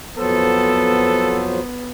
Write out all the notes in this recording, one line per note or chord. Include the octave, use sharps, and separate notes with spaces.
F2 F#3 B3 A4 C5